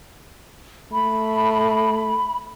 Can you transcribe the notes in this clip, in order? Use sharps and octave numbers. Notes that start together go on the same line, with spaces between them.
A3 B5